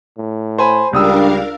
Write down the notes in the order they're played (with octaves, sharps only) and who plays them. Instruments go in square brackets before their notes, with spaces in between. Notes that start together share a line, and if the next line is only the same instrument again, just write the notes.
[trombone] A2
[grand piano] C5 G#5 B5
[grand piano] C#2 D#6 E6 [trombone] G3 [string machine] D4 A#4 F5